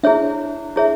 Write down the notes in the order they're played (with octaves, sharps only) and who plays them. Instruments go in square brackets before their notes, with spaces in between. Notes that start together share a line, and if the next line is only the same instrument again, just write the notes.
[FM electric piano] D4 [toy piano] E4 G#4 C#5 E5
[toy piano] E4 G#4 C#5 E5